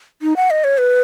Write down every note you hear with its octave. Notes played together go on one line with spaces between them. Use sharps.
D#4
F#5
D#5
C#5
B4